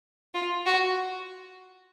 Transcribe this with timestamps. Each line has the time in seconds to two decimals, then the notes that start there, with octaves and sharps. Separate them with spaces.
0.34 F4
0.66 F#4